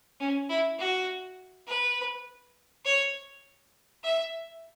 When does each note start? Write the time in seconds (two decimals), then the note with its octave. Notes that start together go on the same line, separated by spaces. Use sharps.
0.20 C#4
0.49 E4
0.78 F#4
1.67 B4
2.85 C#5
4.04 E5